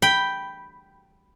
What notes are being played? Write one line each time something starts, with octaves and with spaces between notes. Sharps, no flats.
G5 B5